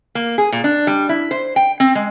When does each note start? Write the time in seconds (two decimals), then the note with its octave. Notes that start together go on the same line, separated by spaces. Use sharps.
0.15 A#3
0.38 G#4
0.52 A#2
0.64 D4
0.87 G3
1.09 E4
1.31 C5
1.56 G5
1.80 C4
1.95 G#3